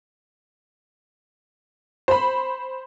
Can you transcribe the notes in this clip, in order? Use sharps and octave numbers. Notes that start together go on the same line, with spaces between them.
C5 B5